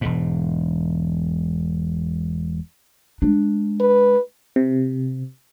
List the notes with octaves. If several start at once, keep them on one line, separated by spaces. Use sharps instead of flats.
E1 G#2
G#3 D4
B4
C3